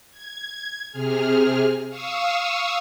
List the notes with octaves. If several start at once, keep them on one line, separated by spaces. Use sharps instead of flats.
G#6
C3 G#4 F6
F5 C#6 D#6 E6